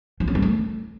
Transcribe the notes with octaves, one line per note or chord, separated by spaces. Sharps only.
F3
C#4
G3
A3